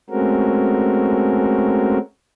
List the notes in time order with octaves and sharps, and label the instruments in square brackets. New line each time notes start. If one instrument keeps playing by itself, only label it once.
[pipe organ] G#3 A3 C4 C#4 F#4 A#4